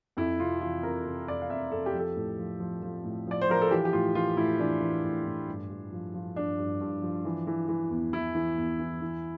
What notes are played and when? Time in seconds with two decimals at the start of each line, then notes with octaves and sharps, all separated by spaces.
0.17 F2 E4
0.40 C3 F4
0.61 E3 F4
0.83 C3 A#4
1.06 C3
1.28 F2 D5
1.42 F5
1.50 F2 E5
1.72 F2 A4
1.86 G4
1.94 F3
1.99 A4
2.16 A2
2.38 F3
2.60 F3
2.82 F3
3.04 A2
3.27 F3 D5
3.41 C5
3.49 F3 A#4
3.61 A4
3.71 E3 G4
3.85 G4
3.93 A2 F4
4.15 E3 F4
4.37 A2 E4
4.60 E3 D4
4.81 E3
5.04 A2
5.26 A2
5.48 G2
5.70 G2
5.92 F3
6.14 F3
6.36 G2 D4
6.59 G2
6.81 G2
7.02 F3
7.25 E3
7.47 E3
7.69 E3
7.91 E2
8.13 E2 E4
8.35 E3
8.58 E2
8.80 E3
9.01 E3